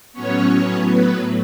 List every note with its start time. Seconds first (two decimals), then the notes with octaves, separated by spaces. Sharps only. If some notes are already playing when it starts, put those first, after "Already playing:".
0.13 A2 F#3 B3 C#4 C#5
0.85 B3 B4